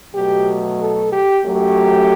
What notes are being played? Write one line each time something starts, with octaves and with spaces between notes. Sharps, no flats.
B2 F#3 A3 G4
A4
G4
F#2 F#3 A3 G4